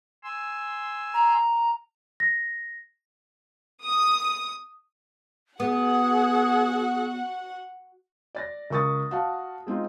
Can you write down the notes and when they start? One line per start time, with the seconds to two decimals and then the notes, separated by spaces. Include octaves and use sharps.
0.23 G#5 C6 E6
1.14 A#5
2.20 A#6
3.83 D#6
5.60 B3 F#4 G#4 F#5
8.35 D5 A6 A#6
8.70 C#2 A#4 C#6 D#6 A6
9.11 F#4 F5 A5
9.67 G#3 C4 D#4 F4